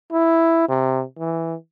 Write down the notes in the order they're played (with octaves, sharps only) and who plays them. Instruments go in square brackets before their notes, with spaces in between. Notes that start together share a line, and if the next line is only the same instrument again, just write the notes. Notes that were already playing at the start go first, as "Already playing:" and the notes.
[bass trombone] E4
C3
E3